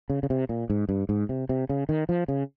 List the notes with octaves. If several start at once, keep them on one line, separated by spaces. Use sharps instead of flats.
C#3
C#3
C3
A#2
G#2
G2
G#2
C3
C3
C#3
D#3
F3
C#3